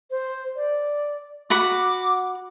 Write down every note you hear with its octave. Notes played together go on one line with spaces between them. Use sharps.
C5
D5
F#4 F#5 B5 D6